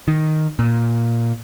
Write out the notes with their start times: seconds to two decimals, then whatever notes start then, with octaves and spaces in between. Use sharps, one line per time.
0.08 D#3
0.59 A#2